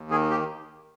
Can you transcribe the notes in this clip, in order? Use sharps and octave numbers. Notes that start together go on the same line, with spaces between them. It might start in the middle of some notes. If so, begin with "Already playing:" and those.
Already playing: D#2
D#3 G#4
G4